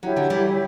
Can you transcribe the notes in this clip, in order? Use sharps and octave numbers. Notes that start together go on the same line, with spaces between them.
D3 F#3 E4 G4 C#5
D3 F#3
E3 G3